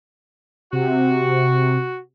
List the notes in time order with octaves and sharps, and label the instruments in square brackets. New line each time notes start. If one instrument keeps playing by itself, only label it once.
[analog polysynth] C3 [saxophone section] F#4